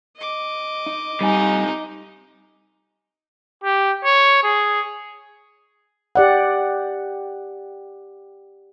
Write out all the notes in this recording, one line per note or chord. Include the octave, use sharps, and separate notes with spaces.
D#5 D6
D#4
C3 G3 D#4 G#5
G4
C#5
G#4
G4 D5 F#5